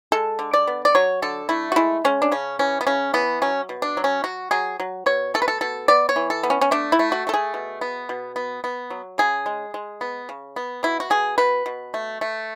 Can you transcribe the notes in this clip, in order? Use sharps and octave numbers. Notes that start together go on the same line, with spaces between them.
G#3 A4
D3
D5
B3
D5
F#3 C#5
D3 A4
A3 E4
F#4
G#3 E4
G#3 C#4
D4
C#3 C#4
E3 C#4
B3
C#3 C#4
E3 B3
F#3 C#4
B2
D4
F#3
C#4
F#3 F#4
F#3 G#4
F#3
B2 C#5
A3 A4
B4
A4
B2 A4
B3 D5
C#5
E3
A4
B3
C#4
C#4
A3 D4
E4
A3
F#4
A3 A4
G#4
B2
B3
B2
B3
B3
F#3
C#3 G#4
G#3
G#3
B3
C#3
B3
B2 E4
F#4
B2 G#4
B2 B4
B2
A3
A3